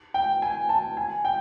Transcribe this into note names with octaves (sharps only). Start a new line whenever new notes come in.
G5
G#5
A5
G#5
G5